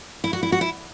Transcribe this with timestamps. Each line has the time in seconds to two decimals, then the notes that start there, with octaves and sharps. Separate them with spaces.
0.24 E4
0.33 F#4
0.43 E4
0.52 F#4
0.61 E4